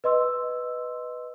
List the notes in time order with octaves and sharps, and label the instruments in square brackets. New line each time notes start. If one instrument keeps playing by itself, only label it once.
[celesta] B4 D#5 C6 E6